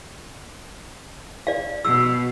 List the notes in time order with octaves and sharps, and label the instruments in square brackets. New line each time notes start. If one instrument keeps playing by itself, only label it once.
[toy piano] D5 F5
[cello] B2 [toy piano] E6